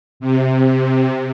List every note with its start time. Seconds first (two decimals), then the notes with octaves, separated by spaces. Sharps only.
0.20 C3
0.64 C3